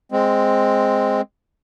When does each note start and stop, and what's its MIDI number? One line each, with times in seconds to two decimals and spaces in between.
0.12 1.21 56
0.12 1.21 60